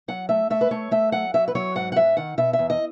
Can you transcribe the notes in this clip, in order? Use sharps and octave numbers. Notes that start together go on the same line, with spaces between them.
F#3 F#5
A3 E5
A3 E5
B4
A3 C#5
A3 E5
F#3 F#5
F#3 E5
B4
F#3 C#5
G#2 F#5
F#5
G#2 E5
D#3 F#5
B2 E5
E5
E2
D#5